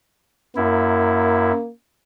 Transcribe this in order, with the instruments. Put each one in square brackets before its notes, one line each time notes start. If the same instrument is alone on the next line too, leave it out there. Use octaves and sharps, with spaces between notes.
[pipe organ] F#2 E4 [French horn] A#3